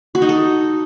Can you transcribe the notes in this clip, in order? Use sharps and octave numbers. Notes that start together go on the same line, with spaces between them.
F#4
D#4
A4